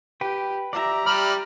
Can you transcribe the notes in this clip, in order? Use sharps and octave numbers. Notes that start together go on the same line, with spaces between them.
G4 B4 G5
G4 D5 E5 A#5
G3 D5 E5 B5 F6